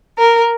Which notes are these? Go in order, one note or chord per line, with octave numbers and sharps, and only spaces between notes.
A#4